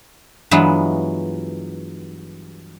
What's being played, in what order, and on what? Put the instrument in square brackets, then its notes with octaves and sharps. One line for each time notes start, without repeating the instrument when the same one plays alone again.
[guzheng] G2 E3 F#3 G#3 B3 F4